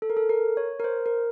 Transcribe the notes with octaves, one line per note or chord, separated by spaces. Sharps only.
A4
A#4
A4
A#4
C#5
A#4
C5
A#4